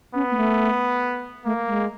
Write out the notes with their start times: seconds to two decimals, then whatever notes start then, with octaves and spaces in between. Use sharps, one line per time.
0.15 B3 C#4
0.31 A#3
0.37 A3
1.45 A3 A#3
1.67 G#3